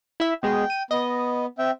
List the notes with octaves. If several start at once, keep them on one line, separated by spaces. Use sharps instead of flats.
E4 E5
B2 G#3 G#4 G5
D#7
B3 D#5
C4 E5 G5